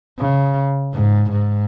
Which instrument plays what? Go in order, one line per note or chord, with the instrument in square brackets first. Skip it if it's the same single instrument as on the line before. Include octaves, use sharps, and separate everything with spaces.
[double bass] C#3
G#2
G#2